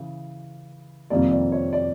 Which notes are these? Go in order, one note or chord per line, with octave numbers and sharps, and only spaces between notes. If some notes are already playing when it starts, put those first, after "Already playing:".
Already playing: C#3 E3
F2 C3 D#3 G3 A#3 D5
D5
C#5
D5